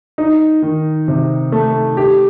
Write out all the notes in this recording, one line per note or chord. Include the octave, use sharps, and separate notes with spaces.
D#4
D#3
C3
A3
G4